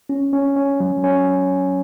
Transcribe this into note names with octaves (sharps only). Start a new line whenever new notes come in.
C#4
C#4
C#4
F#3
C#4